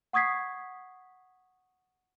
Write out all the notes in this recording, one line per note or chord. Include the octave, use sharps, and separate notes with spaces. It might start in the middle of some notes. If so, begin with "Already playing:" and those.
F#5 C#6 D#6 G#6 B6 C7